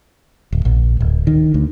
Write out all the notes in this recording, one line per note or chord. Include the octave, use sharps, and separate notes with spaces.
D1
A#1
D1
D#3
D2